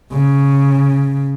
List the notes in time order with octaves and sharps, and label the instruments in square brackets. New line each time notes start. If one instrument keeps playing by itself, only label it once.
[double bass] C#3